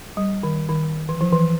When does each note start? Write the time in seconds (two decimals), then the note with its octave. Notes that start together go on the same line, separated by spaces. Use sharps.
0.17 G3
0.43 D#3
0.69 D#3
1.09 E3
1.21 F3
1.32 E3